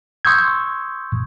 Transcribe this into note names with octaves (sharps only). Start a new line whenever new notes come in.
C6 C#6 D#6 E6 G6 G#6